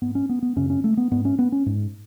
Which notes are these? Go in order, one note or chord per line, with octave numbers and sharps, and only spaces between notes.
G#2 B3
C#4
B3
B3
F#2 C#3 C#4
C#4
A3
B3
G#2 B3
C#4
B3
C#4
G#2